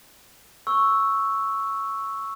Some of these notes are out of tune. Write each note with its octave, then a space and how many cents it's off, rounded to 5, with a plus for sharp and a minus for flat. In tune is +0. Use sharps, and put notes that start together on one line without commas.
C#6 +0 E6 +0